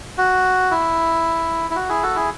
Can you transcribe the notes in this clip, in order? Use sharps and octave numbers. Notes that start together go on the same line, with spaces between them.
F#4
E4
E4
F#4
E4 G#4
F#4 A4
E4 G#4